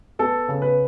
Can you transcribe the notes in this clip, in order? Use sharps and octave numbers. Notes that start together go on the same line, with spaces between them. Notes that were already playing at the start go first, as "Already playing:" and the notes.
B3 A4
C#3
B4